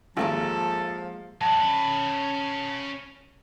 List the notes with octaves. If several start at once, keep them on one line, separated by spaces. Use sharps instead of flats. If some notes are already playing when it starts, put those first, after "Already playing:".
G#1 F3 G#3 A#3 G4 A4
F#3 D4 A5
C#4 B5